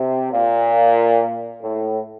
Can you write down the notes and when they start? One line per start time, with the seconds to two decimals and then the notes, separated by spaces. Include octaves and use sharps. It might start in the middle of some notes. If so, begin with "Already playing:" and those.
Already playing: C3
0.32 A#2
1.62 A2